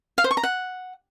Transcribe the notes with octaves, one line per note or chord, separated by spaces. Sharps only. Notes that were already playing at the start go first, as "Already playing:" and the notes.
F5
C5
C#6
A#5
F#5